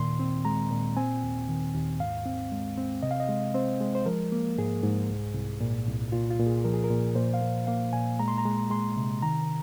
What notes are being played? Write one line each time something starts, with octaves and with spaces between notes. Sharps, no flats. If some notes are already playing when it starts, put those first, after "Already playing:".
Already playing: D#2 A#2 D#3 C6
C4
G#3 A#5
A#2
C4 G#5
D#2
D#3
D#2
G#2 F5
C4
G#3
C4
C3 D#5
F5
D#5
G#3
C4 C5
G#3
C5
F3 A#4
A#3
G#2 G#4
G#2
C2
C2
A#2
C2
A#2 F4
F4
A#2
G#4
F3 A#4
G#4
A#4
A#2
A#2 C5
F5
A#3
A#3 F5
A#2 G#5
G#3 A#5
C6
A#5
G#3
G#3 C6
C3
D#3 A#5